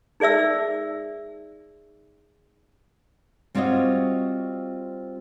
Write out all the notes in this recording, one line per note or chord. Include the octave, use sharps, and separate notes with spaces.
D#4 G#4 D5 E5 E6
G3 C4 F4 F#4 C#5 D#5